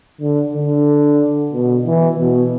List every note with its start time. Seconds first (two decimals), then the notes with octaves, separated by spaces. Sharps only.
0.21 D3
0.54 D3
1.53 B2
1.86 E3
2.18 B2